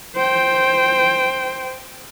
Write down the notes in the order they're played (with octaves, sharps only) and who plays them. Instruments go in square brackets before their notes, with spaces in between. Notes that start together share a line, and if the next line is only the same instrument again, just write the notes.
[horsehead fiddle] C5 G5